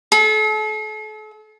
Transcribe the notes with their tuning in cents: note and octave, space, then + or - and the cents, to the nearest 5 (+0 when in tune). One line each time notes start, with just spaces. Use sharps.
A4 -40